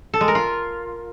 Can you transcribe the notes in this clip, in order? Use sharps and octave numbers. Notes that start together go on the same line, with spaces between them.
A4
G#3
A#4
F4